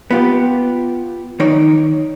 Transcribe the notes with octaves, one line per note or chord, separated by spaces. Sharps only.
B3 F4 G4
D#3 D#4 C#5 D5